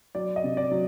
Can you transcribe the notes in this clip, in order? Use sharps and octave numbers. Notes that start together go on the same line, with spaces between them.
F#3 D5
D#5
C3
D5
F#3